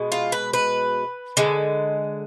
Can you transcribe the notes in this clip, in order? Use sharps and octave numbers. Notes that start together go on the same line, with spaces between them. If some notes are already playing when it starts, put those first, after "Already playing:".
Already playing: B2 G#3
F4
B4
B4
D3 G#3